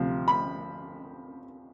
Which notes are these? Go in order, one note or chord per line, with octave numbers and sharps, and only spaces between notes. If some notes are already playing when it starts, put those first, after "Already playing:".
Already playing: D2 C3 F3
B5